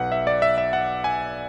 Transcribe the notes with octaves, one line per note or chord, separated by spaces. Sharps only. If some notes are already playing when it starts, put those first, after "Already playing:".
Already playing: B1 B4 F#5
E5
D5
E5
E5
F#5
G#5